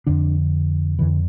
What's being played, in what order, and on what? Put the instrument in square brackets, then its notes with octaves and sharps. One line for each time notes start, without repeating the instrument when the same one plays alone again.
[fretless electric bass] F2 D3 D4
F2 D3 E3